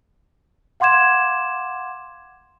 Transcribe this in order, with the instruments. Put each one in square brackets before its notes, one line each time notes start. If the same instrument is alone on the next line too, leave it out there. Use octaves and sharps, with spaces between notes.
[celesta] F5 F#5 C6 D6 G#6 E7